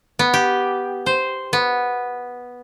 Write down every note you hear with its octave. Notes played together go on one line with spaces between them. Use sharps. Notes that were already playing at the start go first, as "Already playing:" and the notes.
B3
G4
C5
B3